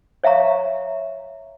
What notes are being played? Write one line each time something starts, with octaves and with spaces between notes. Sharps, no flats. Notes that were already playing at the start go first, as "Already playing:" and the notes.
C#5 E5 F5 A#5 C#6